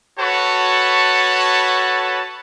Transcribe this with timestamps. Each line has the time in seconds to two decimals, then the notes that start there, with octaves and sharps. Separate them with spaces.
0.19 F#4 A4 B4 C#5 A5 C#6